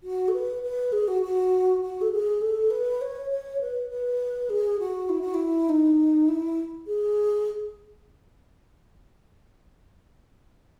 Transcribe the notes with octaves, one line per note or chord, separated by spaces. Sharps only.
F#4
A4
B4
B4
G#4
F#4
F#4
F#4
A4
G#4
A4
B4
C#5
C#5
B4
B4
G#4
F#4
E4
F#4
E4
D#4
E4
G#4